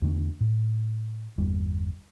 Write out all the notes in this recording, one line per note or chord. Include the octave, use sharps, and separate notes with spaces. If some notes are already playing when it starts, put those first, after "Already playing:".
E2 D3 A3
A2
G1 E2 G3